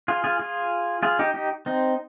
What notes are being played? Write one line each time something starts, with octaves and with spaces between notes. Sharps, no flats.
F4 G#4
F4 G#4
F4 G#4
F4 G#4
D#4 G4
D#4 G4
C4 D#4